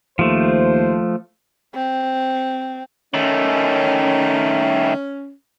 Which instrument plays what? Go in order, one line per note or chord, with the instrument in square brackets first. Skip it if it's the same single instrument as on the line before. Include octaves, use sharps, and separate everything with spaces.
[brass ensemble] D#2 C5 [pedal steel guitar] F3 A3
[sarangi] C4
[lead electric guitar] D#3 A3 [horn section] C#4